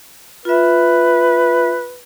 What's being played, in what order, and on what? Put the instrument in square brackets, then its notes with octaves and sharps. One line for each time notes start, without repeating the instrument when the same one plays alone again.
[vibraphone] F4 E5 [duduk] B4